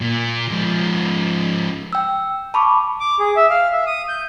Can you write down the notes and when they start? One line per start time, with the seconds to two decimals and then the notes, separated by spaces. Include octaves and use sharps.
0.01 A#2
0.49 G#2 F3
1.93 G5 E6
2.54 A5 B5 C#6 D6
3.00 D6
3.19 G#4
3.36 E5
3.50 F5
3.72 E5
3.87 D#6
4.09 G6